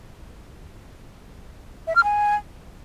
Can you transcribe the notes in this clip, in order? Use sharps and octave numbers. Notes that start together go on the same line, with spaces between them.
E5
F6
G#5